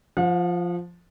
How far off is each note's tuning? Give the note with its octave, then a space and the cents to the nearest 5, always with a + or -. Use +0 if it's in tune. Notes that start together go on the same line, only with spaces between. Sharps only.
F3 +0 F#5 -45